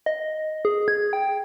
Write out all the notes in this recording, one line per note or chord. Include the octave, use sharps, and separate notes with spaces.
D#5
G#4
G#6
G5